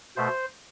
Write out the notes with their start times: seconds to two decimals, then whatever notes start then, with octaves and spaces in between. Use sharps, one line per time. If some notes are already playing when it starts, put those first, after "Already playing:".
0.16 B2 A3 C5